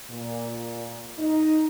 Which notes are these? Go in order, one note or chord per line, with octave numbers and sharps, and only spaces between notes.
A#2
D#4